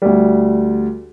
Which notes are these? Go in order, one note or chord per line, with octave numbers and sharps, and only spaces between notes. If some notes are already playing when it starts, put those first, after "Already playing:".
D2 G3